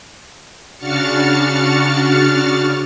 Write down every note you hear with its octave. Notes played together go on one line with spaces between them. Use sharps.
C#3 D4 F#4 F6 A6 C#7